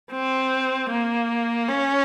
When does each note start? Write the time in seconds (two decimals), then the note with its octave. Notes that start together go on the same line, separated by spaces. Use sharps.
0.12 C4
0.90 A#3
1.69 C#4